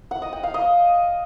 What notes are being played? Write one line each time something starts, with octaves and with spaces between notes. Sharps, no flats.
F#5
D#5
G5
F5
D#5